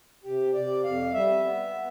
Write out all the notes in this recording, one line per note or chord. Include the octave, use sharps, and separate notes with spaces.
C3 G4
C3 D5
F2 F5
G3 E5
B3
B3